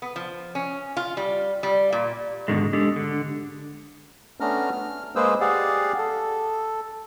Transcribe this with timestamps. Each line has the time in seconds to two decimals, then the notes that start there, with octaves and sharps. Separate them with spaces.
0.02 B3
0.16 F3
0.55 C#4
0.97 F4
1.17 G3
1.63 G3
1.93 A#2
2.48 G#2 B2 D3 D#3 G#3
2.73 G#3 D4 G4 A4
2.96 D3
4.40 A3 B3 C#4 D4 A#5 F6
4.72 F6
5.16 G#3 A#3 G#4 B4 C5 E6
5.41 G4 G#4 D5 F5 F#5
5.98 A4